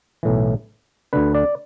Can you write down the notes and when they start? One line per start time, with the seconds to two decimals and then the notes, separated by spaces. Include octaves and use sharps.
0.23 B1 A2 E3
1.13 D2 D3 B4
1.34 D5